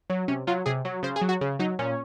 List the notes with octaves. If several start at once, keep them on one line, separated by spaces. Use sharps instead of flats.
F#3
C3 C#4
F#3 F4
C3 G#4
F#3
C#3 C5
G#4
F#3
F#4
C#3
F#3 D#4
A#2 C#4